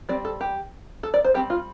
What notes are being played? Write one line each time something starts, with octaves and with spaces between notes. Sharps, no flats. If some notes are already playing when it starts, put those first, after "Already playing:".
G3 C4 D5
A4
G4
A4
D5
C5
G3 C4 G4
F4